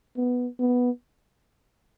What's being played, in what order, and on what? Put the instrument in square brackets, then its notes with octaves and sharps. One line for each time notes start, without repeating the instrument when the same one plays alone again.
[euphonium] B3
B3